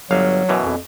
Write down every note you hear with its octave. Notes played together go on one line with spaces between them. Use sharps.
G1 F#3 F5
F#2 B2 E3
F2